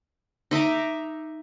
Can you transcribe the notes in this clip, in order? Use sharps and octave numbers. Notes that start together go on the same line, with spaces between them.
D#4 E5 A#5 D6